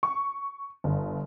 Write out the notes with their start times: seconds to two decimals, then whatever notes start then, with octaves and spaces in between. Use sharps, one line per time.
0.03 C#6
0.84 G1